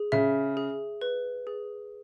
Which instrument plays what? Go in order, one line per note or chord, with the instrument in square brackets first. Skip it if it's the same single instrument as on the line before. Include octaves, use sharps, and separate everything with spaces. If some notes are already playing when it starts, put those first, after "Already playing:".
Already playing: [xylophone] G#4
[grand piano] C#3 [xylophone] E5
[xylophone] G#4
B4
G#4